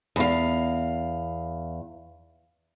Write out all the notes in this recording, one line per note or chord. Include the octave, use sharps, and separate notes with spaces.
E2 F5